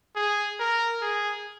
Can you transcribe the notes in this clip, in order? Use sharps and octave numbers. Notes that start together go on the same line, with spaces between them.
G#4
A#4
G#4